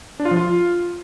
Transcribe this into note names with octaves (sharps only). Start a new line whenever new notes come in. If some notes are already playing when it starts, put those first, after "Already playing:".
D4
F4
F3
F4